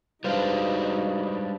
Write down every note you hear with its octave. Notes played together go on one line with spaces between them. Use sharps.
G3 G#3 D4 D#4 F#4 B4 C5 F5